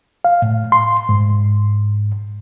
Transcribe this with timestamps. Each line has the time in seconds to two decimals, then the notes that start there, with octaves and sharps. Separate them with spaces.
0.25 F5
0.42 A2
0.72 C6
1.09 G#2